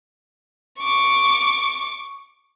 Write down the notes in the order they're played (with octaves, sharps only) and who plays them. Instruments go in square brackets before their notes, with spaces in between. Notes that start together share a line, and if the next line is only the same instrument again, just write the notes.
[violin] C#6 D6